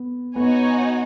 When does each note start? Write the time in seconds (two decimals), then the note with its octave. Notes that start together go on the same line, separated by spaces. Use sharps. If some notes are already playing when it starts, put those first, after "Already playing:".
Already playing: B3
0.36 B3 D#4 F#4 C#5 G#5